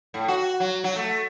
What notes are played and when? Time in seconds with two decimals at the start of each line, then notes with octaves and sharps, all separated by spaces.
0.14 A2
0.28 F#4
0.60 F#3
0.84 F#3
0.96 A3